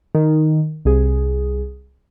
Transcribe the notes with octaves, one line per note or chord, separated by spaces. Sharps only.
D#3
C2 G#4